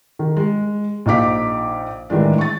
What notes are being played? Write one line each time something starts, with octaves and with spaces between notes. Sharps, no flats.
D#3
G#3
A#1 D#4 F5 D6 B6
A2 D#3 E3 G#3 D4
C#6 A6